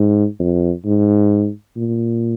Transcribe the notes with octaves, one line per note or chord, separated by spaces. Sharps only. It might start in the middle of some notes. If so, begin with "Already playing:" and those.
Already playing: G#2
F2
G#2
A#2